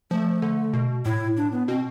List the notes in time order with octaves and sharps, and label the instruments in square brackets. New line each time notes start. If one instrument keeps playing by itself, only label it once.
[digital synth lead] F3 [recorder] A3
[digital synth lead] D3
B2
[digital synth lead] A2 [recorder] E4
[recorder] D4
B3
[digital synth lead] B2 [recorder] C4